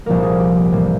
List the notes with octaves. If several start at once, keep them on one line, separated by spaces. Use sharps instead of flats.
C2 A#2 F3 A#3 A#4
G#4
G4
G4
A2 E3 G3 A#3